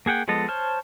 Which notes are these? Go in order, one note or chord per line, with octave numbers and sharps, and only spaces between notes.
A#3 G#4 F#5 G5
F3 G#3 B3 A4 D#5
C5 C#5 A5 F6